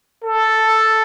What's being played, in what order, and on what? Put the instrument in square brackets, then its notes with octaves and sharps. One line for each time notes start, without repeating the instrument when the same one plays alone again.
[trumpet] A4